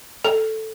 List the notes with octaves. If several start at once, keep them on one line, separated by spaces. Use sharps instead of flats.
A4